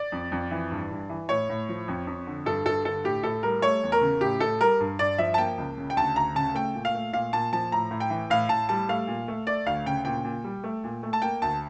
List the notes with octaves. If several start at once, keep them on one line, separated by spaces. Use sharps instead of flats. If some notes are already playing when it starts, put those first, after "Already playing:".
Already playing: D5
F2
F2
E3
G2
G2
E3
A2 C#5
A2
F3
F2
F2
D3
G2 A4
G2 A4
D3 A4
A2 G4
A2 A4
G3 A#4
A3 C#5
E2
A#4
C#3
A2 G4
A2 A4
G3 A#4
G2
G2 D5
F3 E5
A5
A#3 G5
C#2
C#3
G5
D2 A5
D2 A#5
C#3 A5
A3 G5
A#2
F5
A3
A#2 F5
A#2 A5
F3 A5
A2 A#5
A2
G5
E3
A2 F5
A2 A5
G3 A5
A3 F5
A#2
A3
A3 D5
D2 F5
C#3 G5
A#2 G5
A#2
G3
A3
A#2
A3
A5
A#3 G5
D2 A5